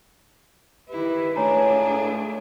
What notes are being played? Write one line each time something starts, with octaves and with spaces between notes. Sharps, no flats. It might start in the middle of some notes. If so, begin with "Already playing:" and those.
D#3 E4 G4 B4
C#2 A2 A3 D4 G#4 C#5 G#5 A#5